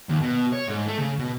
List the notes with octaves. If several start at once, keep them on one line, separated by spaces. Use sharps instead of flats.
D#2
B2
C#5
G#2
A3
C#3
B2